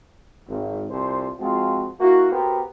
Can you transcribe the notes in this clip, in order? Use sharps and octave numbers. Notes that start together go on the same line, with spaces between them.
G#1
C2 F4 A4 C5
F3 G#3 C4 F4 F#4
A#3 E4 F#4
B3 F#4 G4 A#4 C5